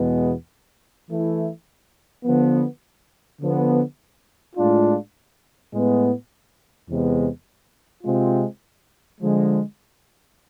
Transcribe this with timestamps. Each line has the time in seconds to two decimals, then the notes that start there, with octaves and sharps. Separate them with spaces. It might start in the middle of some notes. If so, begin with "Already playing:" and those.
Already playing: E2 B2 G#3 B3
1.08 E3 A3 E4
2.24 D3 F3 B3
3.40 D3 F3 B3
4.56 A2 G#3 D4 F4
5.72 A2 G#3 B3
6.88 E2 C3 G#3 B3
8.04 C3 G#3 C4 F4
9.20 D3 F3 G#3